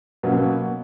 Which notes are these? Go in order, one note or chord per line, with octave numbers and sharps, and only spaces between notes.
B2 F#3 A#3 C#4